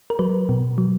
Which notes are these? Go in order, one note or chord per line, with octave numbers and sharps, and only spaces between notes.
A#4
F#3 B4
B2
F#3